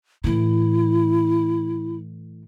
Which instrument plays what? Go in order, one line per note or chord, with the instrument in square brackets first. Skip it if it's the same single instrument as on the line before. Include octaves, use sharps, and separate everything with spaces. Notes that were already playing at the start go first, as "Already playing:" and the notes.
[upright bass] A2 E3 [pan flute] E4